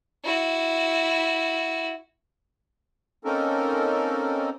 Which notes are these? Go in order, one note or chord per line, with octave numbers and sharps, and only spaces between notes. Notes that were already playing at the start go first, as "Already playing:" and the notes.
E4 F#4
A#3 C4 C#4 D#4 A4 A#4